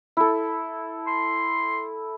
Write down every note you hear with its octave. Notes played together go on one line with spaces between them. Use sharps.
E4 A4
C6